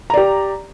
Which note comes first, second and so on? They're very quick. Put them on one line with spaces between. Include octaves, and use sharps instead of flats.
A#5 D5 G4